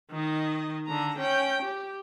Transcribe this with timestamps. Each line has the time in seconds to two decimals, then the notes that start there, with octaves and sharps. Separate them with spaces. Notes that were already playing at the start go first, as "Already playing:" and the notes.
0.12 D#3 D#5
0.87 D3 A#5
1.19 C#4 G5
1.62 G4